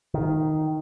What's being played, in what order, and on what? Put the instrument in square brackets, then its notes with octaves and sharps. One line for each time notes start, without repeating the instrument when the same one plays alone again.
[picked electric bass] D#3